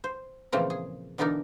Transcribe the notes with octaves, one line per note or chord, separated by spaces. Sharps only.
C5
A#2 C#3 E3 F3 A3 C4
G#4
B2 D3 E3 D4 D#4 A#4